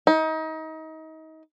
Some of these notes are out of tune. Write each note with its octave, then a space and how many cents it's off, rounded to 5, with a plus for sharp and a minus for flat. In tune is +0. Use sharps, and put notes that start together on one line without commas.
D#4 +30